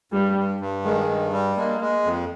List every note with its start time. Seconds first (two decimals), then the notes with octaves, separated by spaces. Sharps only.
0.12 G2 G3
0.36 G2
0.60 G2
0.84 D#3 G#3
1.08 G2
1.33 G3
1.57 G#3 A#3
1.81 G#3
2.05 F2